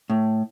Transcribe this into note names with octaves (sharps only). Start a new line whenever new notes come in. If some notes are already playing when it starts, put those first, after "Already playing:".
A2